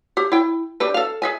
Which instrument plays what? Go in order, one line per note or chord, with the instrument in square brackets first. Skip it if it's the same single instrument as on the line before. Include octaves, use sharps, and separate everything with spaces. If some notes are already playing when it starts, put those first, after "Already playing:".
[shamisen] G4
E4 G5
D4 G4 B4
A4 F5
G#4 E5 G#5